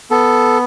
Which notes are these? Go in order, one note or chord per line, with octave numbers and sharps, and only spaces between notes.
B3 A4